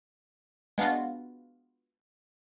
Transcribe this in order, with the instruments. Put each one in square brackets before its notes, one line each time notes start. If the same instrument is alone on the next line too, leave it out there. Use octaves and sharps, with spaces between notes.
[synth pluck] G#3 B3 D4 F4 F#4